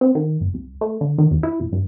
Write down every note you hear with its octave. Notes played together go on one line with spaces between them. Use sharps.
C4
D#3
G1
C2
A3
D3
D#3
E2
E4
F1
G2